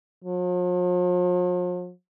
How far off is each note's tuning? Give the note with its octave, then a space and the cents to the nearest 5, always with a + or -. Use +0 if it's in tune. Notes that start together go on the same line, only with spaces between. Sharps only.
F3 +45